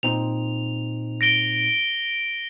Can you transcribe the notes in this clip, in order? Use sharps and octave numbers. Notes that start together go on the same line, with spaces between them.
A#2 C4 D#4 F7
A#6 D7 G7